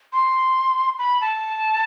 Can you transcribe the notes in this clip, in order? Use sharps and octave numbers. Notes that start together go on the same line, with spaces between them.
C6
B5
A5